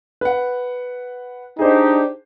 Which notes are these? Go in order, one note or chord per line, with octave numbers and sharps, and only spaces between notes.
B4 F#5
D4 D#4 G4 G#4 C5